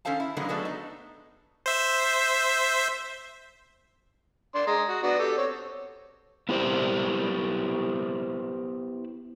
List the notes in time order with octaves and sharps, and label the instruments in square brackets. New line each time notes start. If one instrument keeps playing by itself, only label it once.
[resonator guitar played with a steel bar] D#3 C#4 A4 C5 F5 A5
E4
D3 D#3 F#3 G#3 A#3 B3
F#3 G#3 A3 B3 D4 A4
D#4
[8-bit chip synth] C5 E5
[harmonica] D4 C6
G#3 A#5
F#4
B3 D4 F#4
G4 A4
C4 C#5
[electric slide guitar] B3 E4 G4 C5